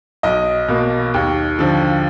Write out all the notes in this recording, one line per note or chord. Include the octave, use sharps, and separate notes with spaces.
B1 D#5
B2 A#3
D#2
D3 F3